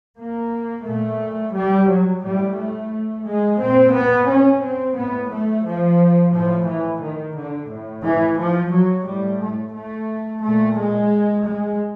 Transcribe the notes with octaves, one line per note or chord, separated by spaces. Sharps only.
A#3
A#2 A3
G3
F#3
A2 G3
A3
G#3
A#2 C4
B3
C#4
C4
A2 B3
A3
F3
A2 F3
E3
D#3
D3
A2
E3
F3
F#3
A2 G3
A3
A3
A#2 A3
G#3
G#3